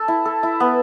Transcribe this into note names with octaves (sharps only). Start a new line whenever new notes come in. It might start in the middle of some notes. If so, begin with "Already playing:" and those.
Already playing: A4
E4
A4
E4
B3